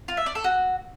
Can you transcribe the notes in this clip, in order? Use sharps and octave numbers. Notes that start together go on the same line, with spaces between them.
F4
E5
D5
A4
F#4